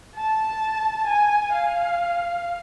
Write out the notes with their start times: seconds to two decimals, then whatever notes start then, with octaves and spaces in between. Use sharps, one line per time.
0.16 A5
1.07 G#5
1.53 F5